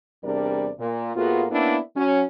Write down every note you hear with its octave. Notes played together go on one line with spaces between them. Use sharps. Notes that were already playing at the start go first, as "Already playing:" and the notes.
E2 C3 G3 D4 A#4 D5
A#2
A2 A#3 B3 F4 F#4 G#4
A#3 B3 C#4 D4 E4
F#3 C#4